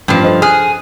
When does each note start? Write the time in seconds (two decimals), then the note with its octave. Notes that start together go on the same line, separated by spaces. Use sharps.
0.08 A1 G2 F3
0.24 A4 C5 D#5
0.42 G#4 D#6 F6 F#6